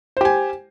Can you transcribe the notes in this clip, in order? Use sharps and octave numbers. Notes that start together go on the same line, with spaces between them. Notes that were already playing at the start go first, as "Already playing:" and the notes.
G4 C5 G#5